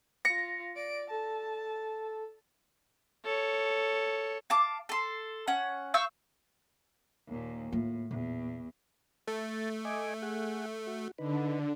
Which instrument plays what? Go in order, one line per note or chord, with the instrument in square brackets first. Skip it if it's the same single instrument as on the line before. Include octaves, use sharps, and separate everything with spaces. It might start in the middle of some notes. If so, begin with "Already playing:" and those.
[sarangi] F4 [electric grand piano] A#6 C#7
[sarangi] D5 [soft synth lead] D7
[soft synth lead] A4 [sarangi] A5
[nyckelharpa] A4 C#5
[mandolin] F5 A5 D6
A4 C6
C#4 F#5
F5 C#6 E6 G6
[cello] D#2 A#2
[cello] A2 [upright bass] A#3 F4
[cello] E2 [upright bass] A#2
[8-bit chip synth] A3 [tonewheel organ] A5
[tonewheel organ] D#5 G#5 D6
G#4 F#5
F#4
[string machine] D3 [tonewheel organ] D#4 B4